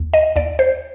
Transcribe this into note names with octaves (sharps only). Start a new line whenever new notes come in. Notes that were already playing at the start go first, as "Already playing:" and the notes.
Already playing: D#2
D#5
D#2 D5
C5